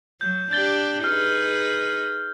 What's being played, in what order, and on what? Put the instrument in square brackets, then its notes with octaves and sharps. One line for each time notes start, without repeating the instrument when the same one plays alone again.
[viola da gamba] F#3 [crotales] G6
[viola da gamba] D4 G4 [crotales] G6 A6 G7
[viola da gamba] D#4 G#4 B4 [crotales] F6